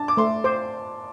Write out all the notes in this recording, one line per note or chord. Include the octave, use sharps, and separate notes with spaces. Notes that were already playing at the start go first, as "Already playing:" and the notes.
Already playing: D4 A5
D6
A3 C6
C5 D6